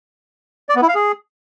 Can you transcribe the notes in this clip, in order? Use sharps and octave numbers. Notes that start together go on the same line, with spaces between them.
D5
B3
E4
F5
G#4